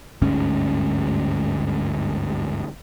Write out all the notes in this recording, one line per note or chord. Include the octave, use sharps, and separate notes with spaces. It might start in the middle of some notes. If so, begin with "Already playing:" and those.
G1 D2 G#2 C#4